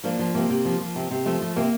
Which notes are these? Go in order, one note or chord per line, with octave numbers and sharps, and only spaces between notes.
F3 A#3 D4
F3
C3 A#3
C3
F3
F3
C3
C3
F3 A3
F3
C3 A#3